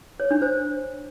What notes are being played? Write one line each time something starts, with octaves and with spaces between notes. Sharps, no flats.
C#5
D4
C5